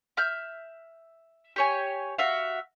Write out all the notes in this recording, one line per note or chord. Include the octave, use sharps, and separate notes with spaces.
E5 F6 G6
G4 C#5 G#5
F#4 E5 F5